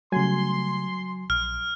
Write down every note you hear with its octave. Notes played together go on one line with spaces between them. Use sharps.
C#3 F#3 G3 A3 G#5 C6
A#1 F6